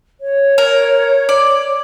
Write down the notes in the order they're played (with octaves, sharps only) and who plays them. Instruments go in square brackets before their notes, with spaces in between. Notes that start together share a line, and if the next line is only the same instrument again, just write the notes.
[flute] C#5
[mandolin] A#4
D5